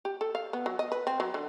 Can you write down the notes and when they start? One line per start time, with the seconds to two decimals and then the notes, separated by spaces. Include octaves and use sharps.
0.05 G4
0.21 A4
0.35 F5
0.53 B3
0.66 F#3
0.79 D#5
0.92 B4
1.07 C4
1.20 F#3
1.34 D3